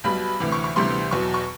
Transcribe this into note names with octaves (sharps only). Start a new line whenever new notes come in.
B1 B2 G3 B5
D2 C3 E3
C#6
C#6
D2 C3 E3 G3 B3 C6
E2 B2 F#3 C#6
C#6